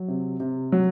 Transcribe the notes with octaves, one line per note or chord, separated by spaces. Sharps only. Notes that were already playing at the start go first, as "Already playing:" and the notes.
Already playing: F#3
C3
C3
F#3